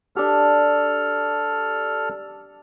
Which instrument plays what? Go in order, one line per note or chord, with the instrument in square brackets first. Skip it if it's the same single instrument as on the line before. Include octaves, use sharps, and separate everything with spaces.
[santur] D4 G4 [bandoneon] A4 F6